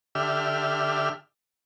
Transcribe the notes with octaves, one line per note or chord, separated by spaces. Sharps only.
D3 G4 E5 F6